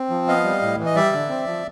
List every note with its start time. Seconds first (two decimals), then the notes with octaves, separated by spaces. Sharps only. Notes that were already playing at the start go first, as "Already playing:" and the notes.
Already playing: C4
0.10 F3
0.27 B3 D#5 F5
0.44 G3
0.62 A2
0.79 E3
0.86 D#5
0.96 G3 D5 E5
1.13 D3
1.29 C4
1.47 F3